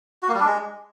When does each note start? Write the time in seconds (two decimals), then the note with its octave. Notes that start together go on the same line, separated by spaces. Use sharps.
0.23 F#4
0.28 A#3
0.34 G3
0.40 D4
0.46 G#3